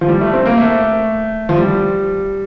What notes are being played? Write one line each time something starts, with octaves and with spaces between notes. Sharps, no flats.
F3
G3
A3
C4
A#3
A3
F3
G3